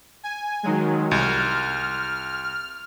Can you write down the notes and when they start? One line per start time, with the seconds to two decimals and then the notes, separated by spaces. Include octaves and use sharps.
0.23 G#5
0.63 D#3 F#3 G#3
1.11 C2 F6